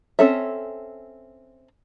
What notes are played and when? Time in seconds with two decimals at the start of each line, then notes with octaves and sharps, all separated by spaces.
0.19 C4 C#4 A4 C#5 E5